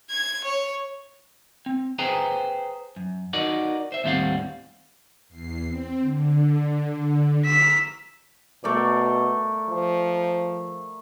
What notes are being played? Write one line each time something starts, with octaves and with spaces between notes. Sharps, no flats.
G#6
C#5
C4
G#4 B4 C5 G5 G#5 A#5
F#2
D#4 F#4 A#4 D5 D#5 F#5
C5 E5
D#2 A2 G3 C4 F5 F#5
E2 C7
C4
D3
A#5 E6 F6 B6
B2 A3 A#4 D5
F3